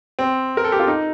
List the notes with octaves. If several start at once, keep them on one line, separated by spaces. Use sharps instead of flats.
C4
A#4
A4
G4
F4
D#4